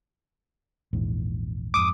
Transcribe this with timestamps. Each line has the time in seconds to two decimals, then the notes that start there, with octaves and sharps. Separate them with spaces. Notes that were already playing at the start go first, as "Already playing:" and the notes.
0.93 A#1 E2 G#2
1.74 F2 G#2 D6 D#6